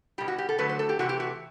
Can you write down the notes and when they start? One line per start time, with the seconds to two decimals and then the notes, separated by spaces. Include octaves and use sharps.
0.18 B2 G3 G4
0.28 F#4
0.38 G4
0.49 A4
0.58 D3 F#3 A3 B4
0.69 C5
0.79 A4
0.89 G4
0.99 C3 E3 A3 F#4
1.09 G4
1.20 F#4